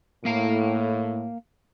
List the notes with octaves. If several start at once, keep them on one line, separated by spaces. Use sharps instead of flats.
A2 A#3 F5 A#5